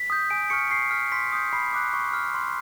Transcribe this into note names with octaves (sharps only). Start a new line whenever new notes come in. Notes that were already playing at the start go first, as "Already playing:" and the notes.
Already playing: B6
D#6 G6
G#5 D7
C#6 F6 C#7
C#6 C7
F6 B6
C6 B6
D#6 G6
B5 C7
D6 F#6
C#6
F6
C6